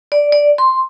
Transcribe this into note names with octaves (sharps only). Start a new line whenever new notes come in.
D5
D5
C6